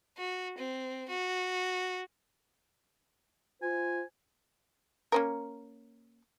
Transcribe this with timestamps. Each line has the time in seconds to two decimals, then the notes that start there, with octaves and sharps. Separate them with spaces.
0.17 F#4
0.58 C4
1.09 F#4
3.62 F4 C5 G#5
5.12 A#3 C#4 A#4